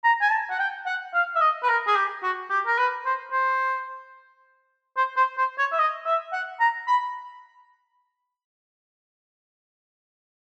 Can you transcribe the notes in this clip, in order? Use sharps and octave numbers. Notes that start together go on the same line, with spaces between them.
A#5
G#5
A5
F#5
G5
F#5
F5
E5
D#5
B4
A#4
G#4
G4
F#4
G4
A#4
B4
C5
C5
C5
C5
C5
C#5
E5
D#5
E5
F#5
A#5
B5